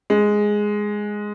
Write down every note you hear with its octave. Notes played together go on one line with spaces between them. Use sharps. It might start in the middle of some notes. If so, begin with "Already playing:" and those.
G#3